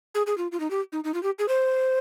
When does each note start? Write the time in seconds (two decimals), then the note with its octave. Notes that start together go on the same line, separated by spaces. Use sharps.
0.15 G#4
0.27 G#4
0.38 F4
0.52 F4
0.60 D#4
0.70 G4
0.92 D#4
1.04 D#4
1.14 F4
1.23 G4
1.39 G#4
1.48 C5